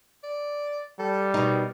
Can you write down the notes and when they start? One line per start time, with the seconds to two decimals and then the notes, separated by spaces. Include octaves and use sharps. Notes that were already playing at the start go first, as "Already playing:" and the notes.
0.23 D5
0.99 G3 A4
1.34 B2 D#4 A#4